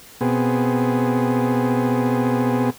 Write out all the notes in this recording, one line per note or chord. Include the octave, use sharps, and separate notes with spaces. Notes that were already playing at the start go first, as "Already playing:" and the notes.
B2 B3 C4 G#4